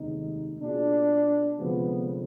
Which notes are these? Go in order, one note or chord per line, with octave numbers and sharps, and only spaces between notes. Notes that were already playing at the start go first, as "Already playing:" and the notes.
Already playing: F1 D#2 D#3 G#3 B3 D#4
B2 A#3 D4 F4 G#4
F1 F2 D3 F3 G#3 B3